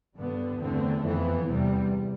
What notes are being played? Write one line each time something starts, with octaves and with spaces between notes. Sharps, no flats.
G2 D3 G3 B3
E2 D3 A3 C4
F2 E3 B3
E2 C3 G3